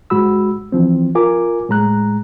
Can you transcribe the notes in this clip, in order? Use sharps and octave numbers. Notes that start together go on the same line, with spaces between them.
G#2 G#3 F#4 B5 E6
E3 F3 C4
F4 A#4 G#5 D6
A2 G#3 A#5 F#6